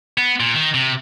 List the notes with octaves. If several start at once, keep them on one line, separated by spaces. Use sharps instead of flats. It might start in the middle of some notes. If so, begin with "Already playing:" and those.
B3
A#2
D#3
C3